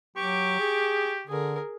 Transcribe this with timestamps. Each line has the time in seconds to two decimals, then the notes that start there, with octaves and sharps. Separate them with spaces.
0.17 F#3 G4 C#6 D6
0.60 G#4
1.27 D3 G#4 A#4